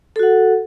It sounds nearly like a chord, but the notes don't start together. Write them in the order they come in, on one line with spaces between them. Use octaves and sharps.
A4 F#4 F#5